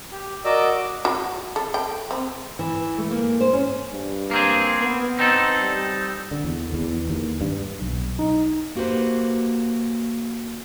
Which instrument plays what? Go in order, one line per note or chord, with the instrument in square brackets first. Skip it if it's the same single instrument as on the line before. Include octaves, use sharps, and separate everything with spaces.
[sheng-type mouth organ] G4
F#4 A#4 D5 D#5 D6 E6
[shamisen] F#4
A4
G5
C4
[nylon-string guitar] E3
A3
A#3
C5
C#4
[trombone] G2
[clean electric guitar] A#3 C4 G#4
[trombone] B3
[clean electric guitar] C4 D#4 A4
[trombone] G3
[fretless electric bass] D3
E2
E2
D#2
G2
[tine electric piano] B1
D#4
[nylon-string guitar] A#3 F#4 G4 B4 C5